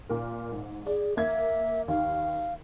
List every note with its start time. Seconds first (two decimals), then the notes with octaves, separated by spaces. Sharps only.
0.09 A#2 A#4
0.52 G#2
0.87 G#4 D5
1.17 A#3 E5 G#6
1.88 D#2 D#3 F5